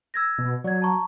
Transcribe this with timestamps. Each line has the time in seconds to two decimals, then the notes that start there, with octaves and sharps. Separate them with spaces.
0.14 E6 G#6 A#6
0.38 B2
0.64 F#3 D5 G#6
0.82 A5 A#5 C#6